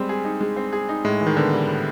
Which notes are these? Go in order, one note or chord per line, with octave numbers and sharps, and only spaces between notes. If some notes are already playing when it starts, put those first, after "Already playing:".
Already playing: G3 G#3 C4
G#4
D#4
G#3
C4
G#4
D#4
A2 G#3
E3
D#3
D3 B3
G3
A2